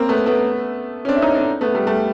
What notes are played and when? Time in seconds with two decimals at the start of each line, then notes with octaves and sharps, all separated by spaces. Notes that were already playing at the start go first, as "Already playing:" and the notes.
Already playing: A#3 C4 C#4
0.09 A3 B3
0.26 A3 B3
1.05 C#4
1.08 C4 D4
1.16 E4
1.22 C#4 D#4
1.35 C4 D4
1.61 A3 B3
1.74 G3 A3
1.87 G3 A3